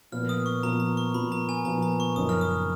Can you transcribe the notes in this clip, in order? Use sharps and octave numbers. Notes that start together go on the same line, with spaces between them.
A#2 F3 B3 F4 F6
D#6
C#6
A#2 F3 B3 F4 A#5
A#5
C#6
A#2 F3 B3 F4 B5
A#5
G#5
A#2 F3 B3 F4 A#5
A#5
C#6
F#1 F#2 F3 A#3 D#4 D#6
F6
D#6